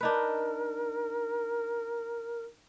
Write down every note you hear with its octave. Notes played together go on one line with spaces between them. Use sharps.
D4 D#4 A#4 B4